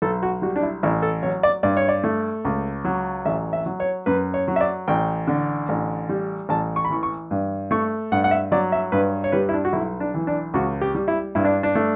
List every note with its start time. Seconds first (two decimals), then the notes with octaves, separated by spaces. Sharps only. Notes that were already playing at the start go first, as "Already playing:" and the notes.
0.02 B1 A4
0.23 F#4
0.42 G3 F#4
0.56 D4
0.63 E4
0.83 A1 E4
1.03 A4
1.23 F#3 C#5
1.43 D5
1.63 G2 D5
1.77 C#5
1.89 D5
2.04 A3
2.45 C#2
2.85 F#3
3.25 A1 E5
3.53 E5
3.66 F#3
3.80 C#5
4.06 F#2 B4
4.34 C#5
4.48 F#3
4.56 E5
4.61 D5
4.88 A1 G5
5.27 D3
5.69 A1
6.09 G3
6.49 A1 A5
6.76 C#6
6.85 B5
6.90 E3 C#6
7.03 C#6
7.31 G2
7.71 A3 C#6
8.12 G2 F#5
8.24 F#5
8.31 E5
8.52 F#3 D5
8.72 E5
8.92 G2 B4
9.24 C#5
9.32 G3 B4
9.49 E4
9.54 D4
9.65 F#4
9.73 B1 E4
10.00 D4
10.14 E3
10.27 D4
10.54 C#2 F#4
10.81 G4
10.95 G3
11.08 E4
11.35 G2 E4
11.44 D4
11.63 D4
11.75 A3